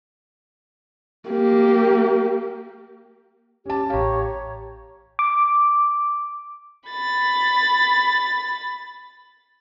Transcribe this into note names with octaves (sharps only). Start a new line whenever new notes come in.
A#3 G4
C#4 G4 A5
A1 G4 C#5 F5 A#5
D6
B5 A6